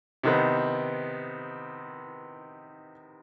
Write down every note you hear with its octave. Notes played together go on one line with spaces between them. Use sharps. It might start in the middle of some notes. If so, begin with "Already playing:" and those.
C3 D#3 B3